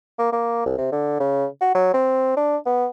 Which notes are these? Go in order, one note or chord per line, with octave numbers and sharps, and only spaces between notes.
A#3
A#3
C2
C3
D3
C#3
F#4
F#3
C4
D4
B3